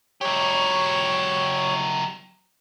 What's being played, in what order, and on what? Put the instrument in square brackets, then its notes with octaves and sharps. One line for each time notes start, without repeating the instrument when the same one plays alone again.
[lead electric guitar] F#3 G4 [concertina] C#5